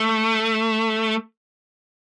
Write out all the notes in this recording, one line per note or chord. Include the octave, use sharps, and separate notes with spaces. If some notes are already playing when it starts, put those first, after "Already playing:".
Already playing: A3